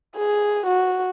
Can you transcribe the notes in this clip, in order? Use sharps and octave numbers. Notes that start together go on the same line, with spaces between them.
G#4
F#4